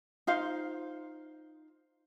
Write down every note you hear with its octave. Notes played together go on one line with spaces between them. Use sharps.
D#4 F4 C5 F5